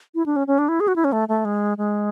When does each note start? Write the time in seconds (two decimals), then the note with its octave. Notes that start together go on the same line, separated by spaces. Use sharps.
0.15 E4
0.26 D4
0.36 C#4
0.47 C#4
0.59 D4
0.69 E4
0.80 G#4
0.88 F#4
0.96 E4
1.04 C#4
1.12 A3
1.28 A3
1.45 G#3
1.78 G#3